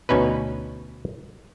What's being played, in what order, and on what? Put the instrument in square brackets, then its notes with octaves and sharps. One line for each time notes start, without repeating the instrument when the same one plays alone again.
[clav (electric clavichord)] D2 B2 C#4 D#4 B4